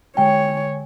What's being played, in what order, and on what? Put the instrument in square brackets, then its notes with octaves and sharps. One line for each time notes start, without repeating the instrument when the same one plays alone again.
[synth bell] D3 G#3 G#5 [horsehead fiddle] C#5 [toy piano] G5